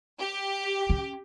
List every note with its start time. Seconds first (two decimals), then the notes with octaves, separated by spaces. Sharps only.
0.21 G4
0.90 C#4